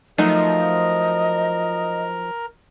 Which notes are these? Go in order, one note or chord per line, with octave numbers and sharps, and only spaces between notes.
F3 F#3 A3 D#4 A#4 D#5